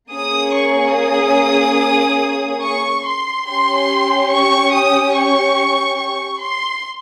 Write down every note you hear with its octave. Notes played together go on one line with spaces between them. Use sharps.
A#3 C#4 G#4 D#6
C#6
D#6
C#6
C6
C#4 G4 C6
C#6
D#6
C#6
C#6
C6